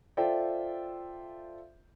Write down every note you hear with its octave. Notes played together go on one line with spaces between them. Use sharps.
F4 A4 C5 D5 E5 G5